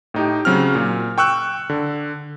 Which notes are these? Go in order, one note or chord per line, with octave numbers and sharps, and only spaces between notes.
A2 D#4 G4
C#3 F#3 C4 F6
A#2
G5 C#6 E6 F#6
D3